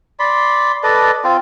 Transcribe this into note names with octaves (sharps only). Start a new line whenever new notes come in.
D5 B5 C6
A4 B4 D5 D#5
C4 F4